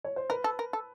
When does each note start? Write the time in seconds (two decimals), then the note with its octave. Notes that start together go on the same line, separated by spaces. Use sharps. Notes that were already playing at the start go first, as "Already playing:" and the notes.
0.04 C#5
0.16 C5
0.30 A#4 B4
0.44 A4
0.59 A#4
0.73 A4